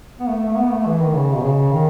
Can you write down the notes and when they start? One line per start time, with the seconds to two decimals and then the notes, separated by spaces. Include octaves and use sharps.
0.20 B3
0.29 A3
0.48 A3
0.56 B3
0.72 A3
0.86 E3
1.01 D#3
1.14 C#3
1.35 B2
1.44 C#3
1.72 D#3